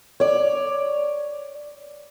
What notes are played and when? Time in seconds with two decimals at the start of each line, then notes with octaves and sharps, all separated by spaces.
0.20 C#5 D5